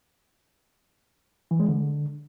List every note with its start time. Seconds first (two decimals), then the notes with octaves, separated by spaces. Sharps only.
1.51 E3
1.60 G#3
1.68 D3